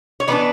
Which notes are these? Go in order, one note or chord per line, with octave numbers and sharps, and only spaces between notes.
C#5
E3 B3 D4 B4 D5